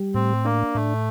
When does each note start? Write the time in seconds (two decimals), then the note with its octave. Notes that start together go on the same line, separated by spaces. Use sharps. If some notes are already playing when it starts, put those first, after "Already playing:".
Already playing: G3
0.14 A2 C4
0.45 A#3 D4
0.74 A2 A3